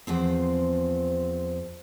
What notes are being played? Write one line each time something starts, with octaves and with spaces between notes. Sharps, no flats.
E2 F3 C4